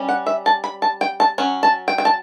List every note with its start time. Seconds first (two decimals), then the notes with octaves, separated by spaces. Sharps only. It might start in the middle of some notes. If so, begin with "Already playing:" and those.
Already playing: G3 C#4
0.09 F#5
0.26 E5
0.46 A5
0.64 B5
0.82 A5
1.01 G5
1.20 A5
1.38 F#3 C#4
1.63 A5
1.88 G5
1.98 G5
2.05 A5